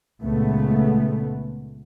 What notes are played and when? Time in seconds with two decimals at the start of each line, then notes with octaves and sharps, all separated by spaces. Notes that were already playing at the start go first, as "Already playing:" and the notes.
0.21 C#2 A#2 A3 B3